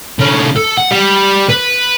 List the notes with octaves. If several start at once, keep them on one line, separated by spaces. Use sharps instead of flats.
D3 C#4
A4
F#5
G3
B4